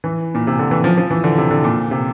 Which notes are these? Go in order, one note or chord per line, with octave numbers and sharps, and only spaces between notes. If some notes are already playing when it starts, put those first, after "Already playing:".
E3
A#2
C3
D3
E3
F3
F3
E3
D3
C3
D3
A#2
C3